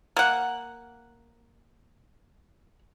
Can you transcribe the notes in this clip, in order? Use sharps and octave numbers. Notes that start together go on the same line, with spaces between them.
A#3 F#5